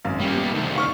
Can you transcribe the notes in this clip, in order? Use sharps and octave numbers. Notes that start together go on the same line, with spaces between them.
G#1 F#2 F5
G3 A#3 C#4
B3 G4
D2 C3 D#3
F5 C#6 F6